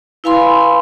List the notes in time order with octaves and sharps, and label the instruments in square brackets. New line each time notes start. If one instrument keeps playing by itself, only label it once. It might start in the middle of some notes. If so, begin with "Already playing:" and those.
[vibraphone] E4 B4 F5 G#5 B5 C6